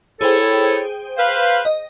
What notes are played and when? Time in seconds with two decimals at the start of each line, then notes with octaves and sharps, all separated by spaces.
0.21 E4 G#4 A4 C5 C#5 G5
1.17 B4 C5 F5
1.65 D#5